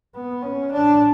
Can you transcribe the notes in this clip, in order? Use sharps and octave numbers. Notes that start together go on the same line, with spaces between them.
B3
C#4
D4